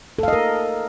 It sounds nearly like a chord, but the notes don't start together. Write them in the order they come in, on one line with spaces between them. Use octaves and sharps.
A4 F5 D#5 A#4